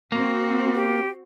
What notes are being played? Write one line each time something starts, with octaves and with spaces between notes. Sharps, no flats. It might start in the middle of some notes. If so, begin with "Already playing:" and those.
A#3 C4 F#4
G4